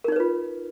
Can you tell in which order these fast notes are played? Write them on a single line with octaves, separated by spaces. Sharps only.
A#4 D#4 C#5 B4 F4